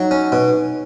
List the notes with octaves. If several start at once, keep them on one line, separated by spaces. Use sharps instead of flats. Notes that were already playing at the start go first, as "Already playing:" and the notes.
Already playing: F#3 D#4
C#4
B2